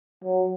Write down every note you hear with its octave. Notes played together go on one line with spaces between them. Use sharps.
F#3